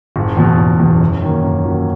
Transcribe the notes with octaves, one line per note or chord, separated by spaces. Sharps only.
F#1
E2 B2
F#1
E2 B2
F#2
D#3 F#3 A#3 C#4
F#2
D#3 F#3 A#3 C#4